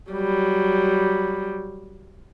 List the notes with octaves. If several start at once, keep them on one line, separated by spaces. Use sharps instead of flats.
F#3 G3